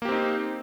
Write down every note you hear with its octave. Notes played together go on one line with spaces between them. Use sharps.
A#3 C4 D#4 G4